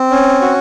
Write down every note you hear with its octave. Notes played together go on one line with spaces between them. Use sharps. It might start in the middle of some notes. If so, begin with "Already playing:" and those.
Already playing: C4
C#4
F#4